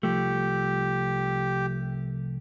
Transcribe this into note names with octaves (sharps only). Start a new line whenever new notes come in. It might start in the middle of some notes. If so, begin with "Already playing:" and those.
C2 F3 A3 G4